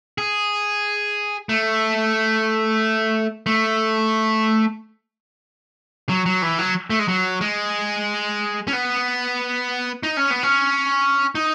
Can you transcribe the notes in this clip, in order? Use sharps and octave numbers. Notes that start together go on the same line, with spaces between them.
G#4
A3
A3
F#3
F#3
E3
F#3
A3
G#3
F#3
G#3
C#4
B3
D#4
C#4
B3
C#4
D#4